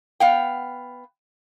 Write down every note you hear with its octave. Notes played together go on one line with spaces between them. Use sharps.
B3 F5 G5